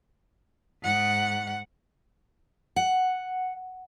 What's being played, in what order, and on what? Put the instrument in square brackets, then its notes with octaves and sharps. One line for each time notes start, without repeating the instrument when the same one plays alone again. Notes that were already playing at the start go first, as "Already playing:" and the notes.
[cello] G#2 F#5
[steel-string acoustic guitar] F#5